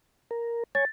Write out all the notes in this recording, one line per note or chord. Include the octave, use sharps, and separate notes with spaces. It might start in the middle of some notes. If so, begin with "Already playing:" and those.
A#4
C#5 G#5 A6